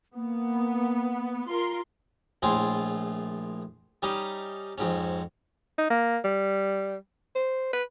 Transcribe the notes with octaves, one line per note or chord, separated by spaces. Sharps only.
A#3 B3
F4 A#4 C6
A#1 A2 F4 G#4 C6
G3 C#4 D#4 G4 D#6
F2 G#2 C#4
D#4
A#3
G3
C5
B4